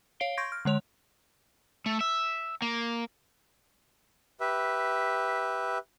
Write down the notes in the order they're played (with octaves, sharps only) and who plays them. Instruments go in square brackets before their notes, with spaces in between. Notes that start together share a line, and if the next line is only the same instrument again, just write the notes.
[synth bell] C#5 F5 C7 D7 G7
C6 C#6 G6 G#6 A#6 D7
F6
D3 G#3 C#5 F7
[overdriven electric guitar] A3
E5
A#3
[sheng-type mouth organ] G4 B4 E5